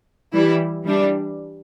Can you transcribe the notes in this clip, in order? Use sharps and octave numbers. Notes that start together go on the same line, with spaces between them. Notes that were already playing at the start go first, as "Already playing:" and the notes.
E3 G3 E4
E3 G3 D4